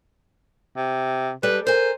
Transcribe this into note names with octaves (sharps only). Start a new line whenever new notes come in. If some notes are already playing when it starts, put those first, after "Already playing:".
C3
G3 G#3 A4 B4
A#4 C5 G#5